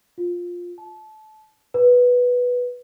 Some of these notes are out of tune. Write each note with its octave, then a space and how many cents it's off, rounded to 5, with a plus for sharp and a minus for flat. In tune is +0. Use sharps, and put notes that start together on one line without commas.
F4 +10
A5 -25
B4 -5